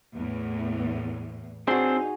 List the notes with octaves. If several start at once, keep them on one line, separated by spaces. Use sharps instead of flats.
E2 A2
C4 D4 D#4 F#4 G#4 C5